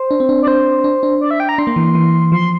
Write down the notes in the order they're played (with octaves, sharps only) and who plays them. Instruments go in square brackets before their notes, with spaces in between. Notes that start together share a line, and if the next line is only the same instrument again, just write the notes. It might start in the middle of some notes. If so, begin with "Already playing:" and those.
Already playing: [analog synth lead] C5
[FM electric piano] D4
C4
D4
[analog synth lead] D5
[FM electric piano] D4 [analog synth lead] C5
[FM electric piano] D4
D4
[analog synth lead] D5
E5
G5
A#5
[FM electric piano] D4 [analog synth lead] C6
[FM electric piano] A#3
E3
E3
[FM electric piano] F3 [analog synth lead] C6